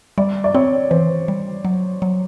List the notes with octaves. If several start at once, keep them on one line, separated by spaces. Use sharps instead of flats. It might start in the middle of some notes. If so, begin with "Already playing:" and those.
G3 D5
D5
C4 C#5
E3 C5
G3
F#3
F#3